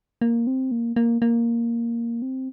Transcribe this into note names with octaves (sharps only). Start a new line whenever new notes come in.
A#3
C4
A#3
A#3
A#3
C4